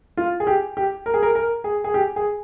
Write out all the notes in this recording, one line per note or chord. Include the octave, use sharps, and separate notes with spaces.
F4
G#4
G4
G4
A#4
G#4
A#4
A#4
G#4
G#4
G4
G#4